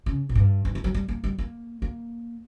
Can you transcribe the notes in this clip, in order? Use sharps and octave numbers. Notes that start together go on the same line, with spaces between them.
C#3
A#2
G2
G2
E3
F#3
G3
A#3
G3
A#3
A#3